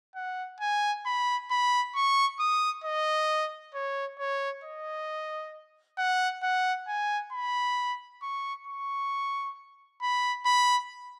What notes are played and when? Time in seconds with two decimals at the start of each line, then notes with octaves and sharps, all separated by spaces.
0.15 F#5
0.61 G#5
1.06 B5
1.51 B5
1.95 C#6
2.40 D#6
2.84 D#5
3.74 C#5
4.19 C#5
4.64 D#5
5.98 F#5
6.42 F#5
6.88 G#5
7.32 B5
8.22 C#6
8.67 C#6
10.02 B5
10.46 B5